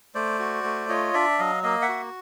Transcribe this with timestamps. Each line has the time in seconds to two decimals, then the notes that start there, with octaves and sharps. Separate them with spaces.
0.15 A3 C5 D5
0.39 F#4
0.64 A3
0.89 F4 C#5 D#5
1.14 D4 D5 E5
1.39 F#3 D#5 F5
1.63 A#3 D#5 F5
1.82 E5 F#5
1.89 F#4